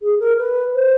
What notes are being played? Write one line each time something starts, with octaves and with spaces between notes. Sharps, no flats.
G#4
A#4
B4
C5